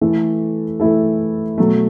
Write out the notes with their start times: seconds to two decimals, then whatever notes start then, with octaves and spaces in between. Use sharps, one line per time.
0.01 E3 A3 E4 A4
0.80 E3 A3 E4 A4
1.58 B2 F#3 A3